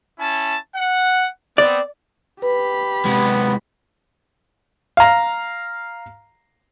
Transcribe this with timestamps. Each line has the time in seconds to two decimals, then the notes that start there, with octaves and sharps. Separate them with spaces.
0.20 C#4 E4 A5
0.76 F#5
1.58 B3 C4 D5
2.42 G4 B4 B5
3.05 C3 G#3 B3
4.97 F5 A#5